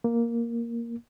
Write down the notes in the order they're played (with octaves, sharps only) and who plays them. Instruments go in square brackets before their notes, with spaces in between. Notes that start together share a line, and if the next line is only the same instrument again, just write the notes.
[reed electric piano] A#3